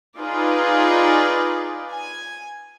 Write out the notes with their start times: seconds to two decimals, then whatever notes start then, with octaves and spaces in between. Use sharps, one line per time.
0.18 D#4 F4 G#4 B4 D5
1.92 G#5